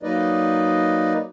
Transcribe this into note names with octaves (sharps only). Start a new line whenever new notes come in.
F#3 A#3 D#4 B4 D5 D#5